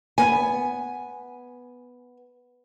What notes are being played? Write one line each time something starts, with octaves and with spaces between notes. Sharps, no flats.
B3 G#5